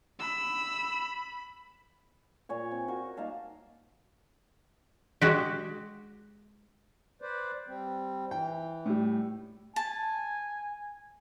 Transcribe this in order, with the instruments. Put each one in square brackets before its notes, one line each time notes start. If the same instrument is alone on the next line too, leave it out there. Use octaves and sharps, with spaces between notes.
[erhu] B5 [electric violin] E6
[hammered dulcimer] A#2 C#5 G#5
C4
F#4 A#4 C#6
A#3 D#4 F5 A5
[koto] G#3 F#4 G4
[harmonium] B4 C5 D5
G3 C4
[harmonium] E3 [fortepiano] G5
[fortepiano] A2 G3
[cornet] G#5 [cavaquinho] A5